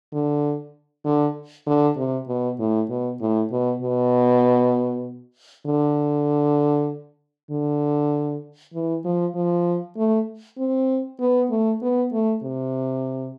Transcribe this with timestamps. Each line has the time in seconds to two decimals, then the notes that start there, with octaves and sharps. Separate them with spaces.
0.13 D3
1.05 D3
1.67 D3
1.97 C3
2.28 B2
2.59 A2
2.89 B2
3.20 A2
3.51 B2
3.82 B2
5.66 D3
7.51 D3
8.74 E3
9.05 F3
9.35 F3
9.97 A3
10.58 C4
11.20 B3
11.50 A3
11.82 B3
12.12 A3
12.43 C3